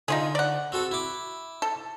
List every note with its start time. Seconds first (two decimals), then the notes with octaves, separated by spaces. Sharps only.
0.08 D3 D#4 F4 G#4
0.35 D5 F#5
0.72 C4 F#4 A4
0.91 E4 D6
1.62 A4